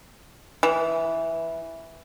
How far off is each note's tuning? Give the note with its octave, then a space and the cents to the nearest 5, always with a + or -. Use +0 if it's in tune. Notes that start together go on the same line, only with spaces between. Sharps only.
E3 -5